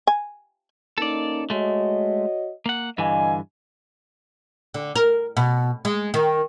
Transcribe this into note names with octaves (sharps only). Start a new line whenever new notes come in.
G#5
A#3 C#4 D#4 A4 D5
G#3 A3 F#4 C#5 D#5
A#3 F#5
G2 D3 E3 D#5 F5 G#5
D3
A#4
B2
G#3
D#3